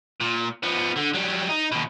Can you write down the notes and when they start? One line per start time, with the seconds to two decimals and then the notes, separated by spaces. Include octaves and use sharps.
0.21 A#2
0.63 F3 B3
0.97 D3
1.15 F#3 G3
1.50 D#4
1.72 D#2 B2